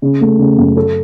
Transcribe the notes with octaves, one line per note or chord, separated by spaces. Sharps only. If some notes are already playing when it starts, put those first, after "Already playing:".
C#3
A3
C#3
F#2
A4